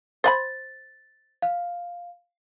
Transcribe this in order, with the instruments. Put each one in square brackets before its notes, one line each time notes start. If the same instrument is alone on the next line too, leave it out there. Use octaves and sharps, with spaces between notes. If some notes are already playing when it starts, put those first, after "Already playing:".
[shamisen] C5 F#5 B5 [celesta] A6
[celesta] F5